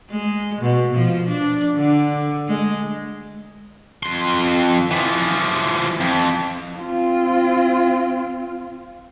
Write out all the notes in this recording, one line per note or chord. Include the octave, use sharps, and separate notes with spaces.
G#3
B2
F3
D4
D3
G#3
F2 C6
E3 F3
F2
C4 F4